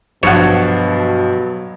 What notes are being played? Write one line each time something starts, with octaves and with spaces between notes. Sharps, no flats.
G2 B2 F3 F#3 C#5 F#5 G#6